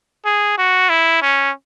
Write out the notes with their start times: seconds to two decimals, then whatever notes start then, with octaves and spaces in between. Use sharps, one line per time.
0.25 G#4
0.58 F#4
0.90 E4
1.22 C#4